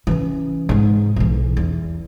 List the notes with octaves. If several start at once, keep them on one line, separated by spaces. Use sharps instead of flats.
E3 C#4
G#2 G#3
B1 E3
E2